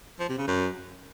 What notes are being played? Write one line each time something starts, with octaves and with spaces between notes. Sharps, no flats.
F3
C3
C#3
F#2